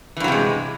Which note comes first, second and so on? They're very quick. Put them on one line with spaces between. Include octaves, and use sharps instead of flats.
E3 G2 F#3 C3 G#3